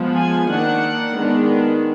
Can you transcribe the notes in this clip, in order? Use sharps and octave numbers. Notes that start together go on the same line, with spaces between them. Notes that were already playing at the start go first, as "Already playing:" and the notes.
Already playing: F3 G#3 B3
G#5
D#3 A#3 D4 F#5
D#3 G#3 B3 D4